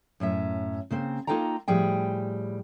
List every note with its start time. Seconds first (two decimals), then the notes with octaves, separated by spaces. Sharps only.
0.20 F#2 A2 C#4 E5
0.91 C#3 A#3 C4
1.27 A#3 D#4 F4 A4 G5 A#5
1.68 A2 F3 G3 G#4 G5